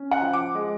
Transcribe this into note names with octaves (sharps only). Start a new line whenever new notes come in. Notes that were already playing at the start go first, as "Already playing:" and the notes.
Already playing: C#4
F#5
F3
D6
G#3